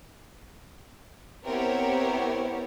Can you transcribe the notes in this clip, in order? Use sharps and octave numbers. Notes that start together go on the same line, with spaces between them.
B3 C4 E4 G4 A#4 C#5